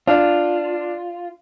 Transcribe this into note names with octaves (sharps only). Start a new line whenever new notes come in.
D4 F4